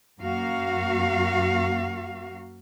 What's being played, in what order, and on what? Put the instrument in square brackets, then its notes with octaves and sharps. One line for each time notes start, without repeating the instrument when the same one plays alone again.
[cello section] F#2 A#3 F#4 F5